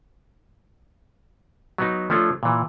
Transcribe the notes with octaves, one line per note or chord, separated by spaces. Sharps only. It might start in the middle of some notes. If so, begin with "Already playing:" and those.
F#3 B3 D#4
F3 A3 C#4 D4 F4
A#2 E3